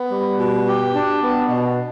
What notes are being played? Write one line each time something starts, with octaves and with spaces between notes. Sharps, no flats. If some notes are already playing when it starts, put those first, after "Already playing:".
Already playing: B3
G3
B2
G4
D4
B3
B2